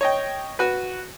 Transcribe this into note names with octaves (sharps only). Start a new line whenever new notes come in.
C#5 D#5 G5
F#4 B4